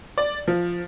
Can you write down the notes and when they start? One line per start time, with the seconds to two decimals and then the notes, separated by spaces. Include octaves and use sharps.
0.18 D5
0.48 F3